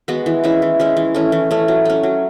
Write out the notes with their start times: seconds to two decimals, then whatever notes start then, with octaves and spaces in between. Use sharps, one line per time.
0.08 G#3 B3 F#4
0.26 E3
0.44 G#3 C#4 E4
0.62 E3
0.80 G#3 C#4 E4
0.97 E3
1.14 A3 C#4
1.32 E3
1.51 A3 C#4
1.68 F#3
1.85 A3 C#4
2.03 F#3